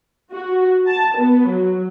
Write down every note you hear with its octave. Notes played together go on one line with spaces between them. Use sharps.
F#4
A5
B3
F#3